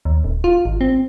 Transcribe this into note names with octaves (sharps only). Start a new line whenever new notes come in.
D#2
D1
F4
G#1
C4